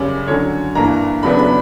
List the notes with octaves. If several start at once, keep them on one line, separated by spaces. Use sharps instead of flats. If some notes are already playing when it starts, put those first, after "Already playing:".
Already playing: F#2 C#3 G3 C#4 D5
D3 F#3 C#4 C#5
G2 E3 A#3 A#5
E2 C#3 F#3 B3 D4 B5
B5